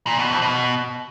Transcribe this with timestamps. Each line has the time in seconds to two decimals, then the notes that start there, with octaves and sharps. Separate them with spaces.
0.07 A#2
0.18 B2
0.30 F2
0.42 B2